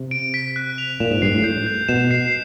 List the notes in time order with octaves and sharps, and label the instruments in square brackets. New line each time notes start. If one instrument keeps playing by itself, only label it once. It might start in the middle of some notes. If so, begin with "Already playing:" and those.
Already playing: [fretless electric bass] C3
[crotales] D7
B6
F#6
F7
[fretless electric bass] A#2 [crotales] E7
[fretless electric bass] G#2
[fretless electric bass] G2 [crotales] C7
[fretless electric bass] A2
[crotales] G6
G6
[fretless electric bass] B2 [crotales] E7
[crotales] C7